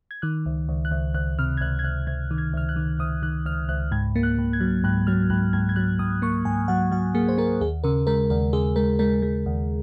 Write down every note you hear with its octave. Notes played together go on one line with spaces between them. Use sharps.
G#6
D#3 F#6
C#2
C#2
F#6
C#2
C#2 F#6
C3 F6
G#6
C#2 F#6
G#6
C#2 F#6
C#2 G#6
D#3
G#6
C#2 F6
F#6
D#3
C#2 D#6
D#3 F#6
C#2 F6
C#2 F#6
G#2 G#6
A#3
F#6
G#2
G#6
F#3
G#2 F#6
F#3 F6
G#2 F#6
G#2 G#6
G#6
F#3 F#6
G#2 D#6
A#3 C#6
G#2 G#5
F#3 F#5
F#3 F#5
A#3 G#4
C5
A#3 A#4
D#2 G#4
C#3 A#4
G#3 A#4
D#2 A#4
C#3 G#4
G#3 A#4
G#3 A#4
G#3
D#2